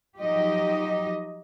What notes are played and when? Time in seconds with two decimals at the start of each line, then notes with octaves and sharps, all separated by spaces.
0.18 F3 F#3 D#4 G4 D#5